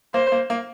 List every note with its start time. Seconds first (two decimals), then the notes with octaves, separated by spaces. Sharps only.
0.14 A#3 C5
0.32 A#3
0.50 A#3